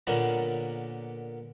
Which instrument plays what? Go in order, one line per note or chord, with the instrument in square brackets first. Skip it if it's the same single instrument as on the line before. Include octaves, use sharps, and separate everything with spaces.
[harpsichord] A#2 D3 A#3 B3 C#4 A#4